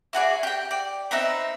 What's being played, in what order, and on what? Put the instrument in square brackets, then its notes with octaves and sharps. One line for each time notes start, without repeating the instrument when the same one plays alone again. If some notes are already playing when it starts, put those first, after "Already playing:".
[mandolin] E4 F#4 G#4 D5
G4 G5
D5
B3 C4 D#4 E5